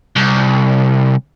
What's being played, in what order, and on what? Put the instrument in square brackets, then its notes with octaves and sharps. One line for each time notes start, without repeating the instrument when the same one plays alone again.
[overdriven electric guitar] C2